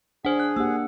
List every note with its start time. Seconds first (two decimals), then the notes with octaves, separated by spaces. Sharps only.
0.25 D4 G#4 C5 F#5
0.40 F#6
0.56 A#3 G4 F#5 E6